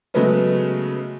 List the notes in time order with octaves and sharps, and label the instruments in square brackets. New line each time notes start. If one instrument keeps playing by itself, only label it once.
[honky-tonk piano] C#3 F#3 G#3 A3 B3 C#4